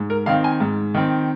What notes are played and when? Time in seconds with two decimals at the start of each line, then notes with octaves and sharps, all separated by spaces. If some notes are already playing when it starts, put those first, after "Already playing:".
Already playing: G#2
0.10 A#4
0.26 D#3 C4 F5
0.44 G#5
0.60 G#2
0.94 D#3 C4